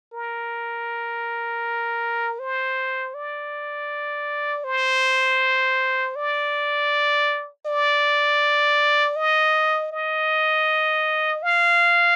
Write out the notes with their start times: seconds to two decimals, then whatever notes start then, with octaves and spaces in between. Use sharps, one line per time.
0.13 A#4
2.39 C5
3.15 D5
4.64 C5
6.16 D5
7.66 D5
9.16 D#5
9.92 D#5
11.42 F5